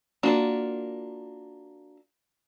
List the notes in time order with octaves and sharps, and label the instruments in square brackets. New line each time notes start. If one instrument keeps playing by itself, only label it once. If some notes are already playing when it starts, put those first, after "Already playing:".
[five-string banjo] A#3 D4 F4 F#4